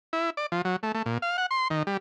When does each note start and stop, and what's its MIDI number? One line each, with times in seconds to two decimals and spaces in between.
0.13 0.30 64
0.37 0.46 74
0.52 0.62 53
0.65 0.76 54
0.83 0.92 57
0.95 1.03 57
1.06 1.18 46
1.22 1.37 77
1.38 1.46 78
1.51 1.68 84
1.70 1.83 51
1.87 1.97 55